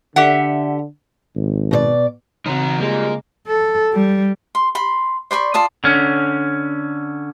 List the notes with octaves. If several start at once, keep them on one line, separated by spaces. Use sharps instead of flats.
D3 G4 E5 F#5
G#1
B2 C5 D5
C#3 E3 C4 D#4 F#4 A#5
G3 G#3 A#3 F4
A4
G3
C6
B5 C6
C5 D5 B5 C#6
F4 D5 A5 D#6
D3 C#4